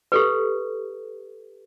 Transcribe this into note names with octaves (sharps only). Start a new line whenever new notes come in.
G4 A4 B4